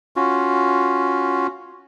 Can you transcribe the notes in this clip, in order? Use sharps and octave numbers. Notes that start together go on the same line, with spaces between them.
C#4 F4 F#4